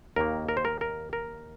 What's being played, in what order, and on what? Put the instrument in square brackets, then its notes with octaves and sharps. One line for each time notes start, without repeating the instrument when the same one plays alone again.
[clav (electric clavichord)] D#2 D#3 A#3 A#4
A#4
C5
A#4
A#4
A#4